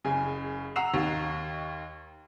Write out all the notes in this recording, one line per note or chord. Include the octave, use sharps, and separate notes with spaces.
F#1 C#3 G#5
F#5 A#5 E6 C7 E7 F7
D#2 D#3